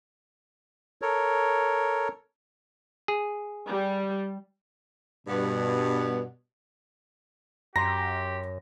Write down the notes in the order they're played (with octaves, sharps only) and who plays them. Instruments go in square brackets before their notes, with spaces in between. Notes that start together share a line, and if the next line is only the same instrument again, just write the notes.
[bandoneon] A4 A#4 C#5
[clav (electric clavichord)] G#4
[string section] G3
[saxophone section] G2 B3 [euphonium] B2
[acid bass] F#2 [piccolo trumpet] G4 [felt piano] A#5 C6 [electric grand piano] A#6